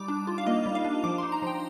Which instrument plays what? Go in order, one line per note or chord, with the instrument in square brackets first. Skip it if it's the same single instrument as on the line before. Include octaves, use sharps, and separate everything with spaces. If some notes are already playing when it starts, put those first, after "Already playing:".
Already playing: [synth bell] G3 D#4 D6
D4
F4
F5
A#3 D#5
G3
F5
D4
F3 D6
C6
D#4
A#5
F3 G5